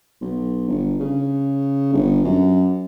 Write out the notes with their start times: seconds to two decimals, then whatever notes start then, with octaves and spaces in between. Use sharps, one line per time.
0.21 B1
0.68 G1
1.01 C#3
1.93 G1
2.24 F#2